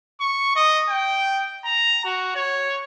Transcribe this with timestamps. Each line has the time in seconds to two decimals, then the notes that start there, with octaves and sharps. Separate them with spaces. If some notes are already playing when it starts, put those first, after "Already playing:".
0.21 C#6
0.56 D#5
0.89 G5
1.65 A#5
2.05 F#4
2.35 C#5